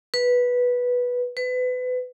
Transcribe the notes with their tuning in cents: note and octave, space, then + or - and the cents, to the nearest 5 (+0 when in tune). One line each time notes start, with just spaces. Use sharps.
B4 -10
B4 +30